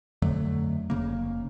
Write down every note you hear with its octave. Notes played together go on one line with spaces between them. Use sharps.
F2 D3 F#3 A3
F1 C#3 A#3